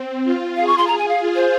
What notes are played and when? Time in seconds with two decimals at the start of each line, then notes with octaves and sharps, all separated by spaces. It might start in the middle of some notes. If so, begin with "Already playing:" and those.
Already playing: C4
0.24 F4
0.56 G#4 F5
0.67 C#6
0.78 C6
0.87 A#5
0.98 G#5
1.08 F5
1.20 F4
1.35 C5